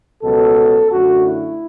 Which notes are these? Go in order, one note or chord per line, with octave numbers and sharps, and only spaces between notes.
C#2 B2 F#3 A4
F#2 D3 A3 F#4
E4